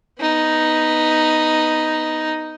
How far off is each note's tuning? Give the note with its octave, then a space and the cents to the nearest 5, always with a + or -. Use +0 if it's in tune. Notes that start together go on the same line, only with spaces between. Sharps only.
B3 +0 D#4 +0